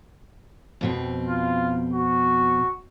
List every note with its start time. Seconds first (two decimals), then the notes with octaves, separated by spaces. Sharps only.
0.81 F2 B2 C4
1.27 F4
1.93 F#4